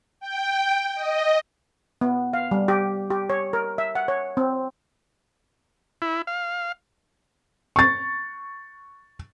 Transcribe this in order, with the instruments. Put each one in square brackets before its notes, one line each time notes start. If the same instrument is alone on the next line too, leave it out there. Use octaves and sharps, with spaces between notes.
[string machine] G5
D#5
[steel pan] B3
F5
G3
G4
G4
C#5
A#4
E5
F#5
C#5
C4
[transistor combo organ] E4
F5
[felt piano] C#6 A6